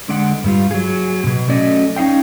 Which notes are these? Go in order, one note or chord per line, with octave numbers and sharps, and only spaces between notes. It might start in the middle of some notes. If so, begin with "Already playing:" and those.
D3 G#3 D4 D5 F#5
G2 G3 F4
F#3 G#4
G#2 B2
F#3 A3 C#4 D5 D#5
C#4 D#4 A4 F5 G5